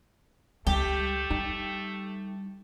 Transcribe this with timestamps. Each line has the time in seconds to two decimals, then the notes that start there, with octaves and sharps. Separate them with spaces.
0.67 C#2 G3 A3 G4
1.30 G3 D#4